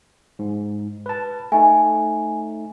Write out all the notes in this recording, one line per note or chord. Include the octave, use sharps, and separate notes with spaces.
G#2
B4 A5
A3 D#4 G#5